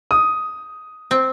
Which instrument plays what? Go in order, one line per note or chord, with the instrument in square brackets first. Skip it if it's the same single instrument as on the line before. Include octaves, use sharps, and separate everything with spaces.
[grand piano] D#6
[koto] C4